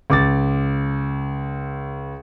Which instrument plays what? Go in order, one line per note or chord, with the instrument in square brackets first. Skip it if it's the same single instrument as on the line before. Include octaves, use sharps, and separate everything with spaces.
[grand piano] C#2 D6 A6